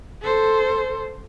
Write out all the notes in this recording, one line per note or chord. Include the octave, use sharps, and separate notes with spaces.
A4 C5